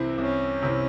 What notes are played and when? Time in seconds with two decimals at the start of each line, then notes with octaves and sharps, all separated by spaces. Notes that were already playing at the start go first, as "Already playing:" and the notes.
Already playing: C2 C3 E3 C4 E4
0.18 C2 C#4
0.62 C3 E3 C4 E4